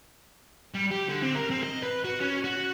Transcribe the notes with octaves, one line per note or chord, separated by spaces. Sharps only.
G3
G4
D3
C4
A#4
C4
D#5
B4
F#4
C#4
F#4